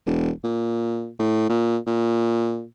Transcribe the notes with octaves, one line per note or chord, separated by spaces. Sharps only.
E1
A#2
A2
A#2
A#2